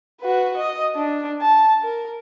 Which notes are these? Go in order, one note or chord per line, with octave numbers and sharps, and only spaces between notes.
F#4 B4
D#5
D4
A5
A#4